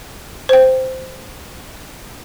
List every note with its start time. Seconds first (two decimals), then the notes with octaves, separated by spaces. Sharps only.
0.49 C5 G5